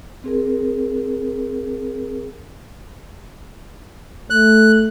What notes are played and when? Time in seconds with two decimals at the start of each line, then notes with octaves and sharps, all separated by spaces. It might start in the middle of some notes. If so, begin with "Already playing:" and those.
0.24 C4 G#4 A#4
4.30 A3 F#6